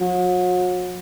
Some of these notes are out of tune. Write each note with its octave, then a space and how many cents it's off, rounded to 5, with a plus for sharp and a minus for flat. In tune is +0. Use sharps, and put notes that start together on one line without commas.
F#3 -40